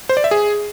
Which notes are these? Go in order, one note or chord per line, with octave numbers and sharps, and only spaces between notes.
C5
D5
E5
G#4